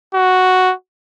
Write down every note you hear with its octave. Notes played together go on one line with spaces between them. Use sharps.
F#4